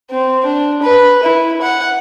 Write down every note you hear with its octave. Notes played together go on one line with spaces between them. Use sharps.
C4
D4
B4
E4
F#5